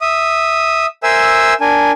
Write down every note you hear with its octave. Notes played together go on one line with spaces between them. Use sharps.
E5 D#6
A#4 C5 E5 G#5 E6
D4 A#4 G#5